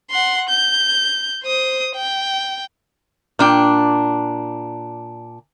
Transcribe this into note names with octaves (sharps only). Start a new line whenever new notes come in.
F#5 C6
G6
C5 D#6
G5
A#2 D4 G5